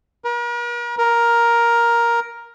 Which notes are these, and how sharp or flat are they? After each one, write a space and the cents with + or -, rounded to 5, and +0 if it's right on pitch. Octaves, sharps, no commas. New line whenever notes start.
A#4 +45
A#4 +10